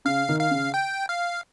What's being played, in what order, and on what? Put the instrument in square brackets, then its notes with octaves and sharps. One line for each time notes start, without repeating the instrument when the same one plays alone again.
[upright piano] C#3 [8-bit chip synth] F5
[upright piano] D#3
[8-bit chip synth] F5
[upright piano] C#3
[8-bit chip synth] G5
F5